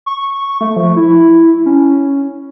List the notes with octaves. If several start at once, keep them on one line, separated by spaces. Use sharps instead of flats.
C#6
A3
F3
E4
C#4